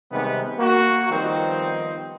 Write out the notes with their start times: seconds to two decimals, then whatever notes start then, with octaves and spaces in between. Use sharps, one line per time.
0.12 C3 D#3 G3 G#3 B3
0.59 A#3 F#4
1.11 D#3 F3 G3 B3 C4 D#4